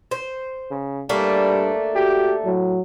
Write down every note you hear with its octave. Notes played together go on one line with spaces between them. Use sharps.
C5
C#3
G2 G3 A3 A#3 D4
F#4 G4
A2 F#3